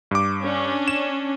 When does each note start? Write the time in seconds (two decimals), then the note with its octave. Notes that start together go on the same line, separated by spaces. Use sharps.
0.11 G2 D6
0.42 C#4 D4
0.88 E7